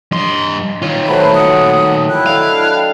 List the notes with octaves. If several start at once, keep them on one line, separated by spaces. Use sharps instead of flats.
G2 D#5 C6
D#3 F4 C#5 C#6
F#3 A3 B4 C5 B5
F#5 D#6
E4 G5 F#6
D3 A4 D#5 F5